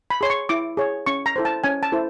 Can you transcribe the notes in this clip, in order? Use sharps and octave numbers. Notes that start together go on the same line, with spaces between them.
B5
G#4 C#5 C6
C#6
E4 D6
G#4 C#5
C#4 C#6
A#5
E4 A4 C5
A5
C#4 G#5
A5
E4 A4 C5